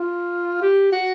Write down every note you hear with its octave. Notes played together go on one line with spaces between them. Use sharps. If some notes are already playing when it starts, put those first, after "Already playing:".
Already playing: F4
G4
F#4